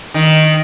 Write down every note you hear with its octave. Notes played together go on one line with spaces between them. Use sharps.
D#3